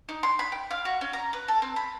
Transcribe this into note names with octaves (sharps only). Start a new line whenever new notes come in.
D#4
C6
B5
G5
F5
F#4
C#4
A#5
B4
A4
C4
B5